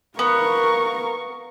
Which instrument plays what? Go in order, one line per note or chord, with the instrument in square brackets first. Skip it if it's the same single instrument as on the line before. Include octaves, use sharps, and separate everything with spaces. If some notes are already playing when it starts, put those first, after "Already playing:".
[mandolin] B3 [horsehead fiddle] A#4 [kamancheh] F5 C#6